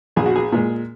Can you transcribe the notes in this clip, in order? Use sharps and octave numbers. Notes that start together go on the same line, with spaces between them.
A#1 G#4
F#4
G#4
A#2 G#3